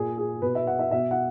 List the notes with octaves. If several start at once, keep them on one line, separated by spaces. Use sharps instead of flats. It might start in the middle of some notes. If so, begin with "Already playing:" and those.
Already playing: A#2 G#4
G#4
B2 B4
E5
F#5
E5
B2 E5
F#5